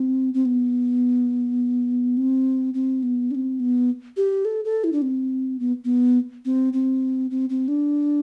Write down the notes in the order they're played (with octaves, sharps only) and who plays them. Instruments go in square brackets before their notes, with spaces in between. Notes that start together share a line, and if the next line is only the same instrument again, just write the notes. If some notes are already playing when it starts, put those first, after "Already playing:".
Already playing: [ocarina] C4
C4
B3
C4
C4
B3
D4
C4
B3
G4
A4
A4
E4
D4
C4
B3
B3
C4
C4
C4
C4
D4